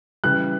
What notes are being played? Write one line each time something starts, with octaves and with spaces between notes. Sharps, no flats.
C#3 E3 G3 F#6